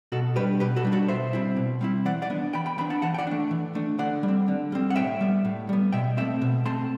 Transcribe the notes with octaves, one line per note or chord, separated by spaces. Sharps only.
B2 F#4 A4
G3 D4 G4 B4
B2 G4 B4
F#4 A4
G3 D4
F#4 A4
B2 C5 E5
G3 C4 E4
B2
G3 C4 E4
E3 D5 F#5
D5 F#5
B3 D4
E3 G5 B5
G5 B5
B3 D4 G5 B5
F#5 A5
E3 F#5 A5
G5
D5 F#5
A3 D4
E3
A3 D4
D3 D5 F#5
G3
C4
D3
G3 C4
F#5
A2 E5 G5
G3 B3
A2
G3 B3
B2 E5 G5
A3 C4 E5 G5
B2
A3 C4 A5 C6